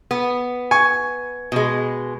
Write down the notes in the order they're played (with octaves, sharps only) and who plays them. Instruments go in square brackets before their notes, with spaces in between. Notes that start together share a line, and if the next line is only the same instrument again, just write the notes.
[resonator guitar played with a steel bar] B3
[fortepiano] G#5 C#6
[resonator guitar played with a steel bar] B2 G#3